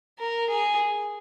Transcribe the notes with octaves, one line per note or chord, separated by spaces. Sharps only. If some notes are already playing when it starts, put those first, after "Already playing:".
A#4
G#4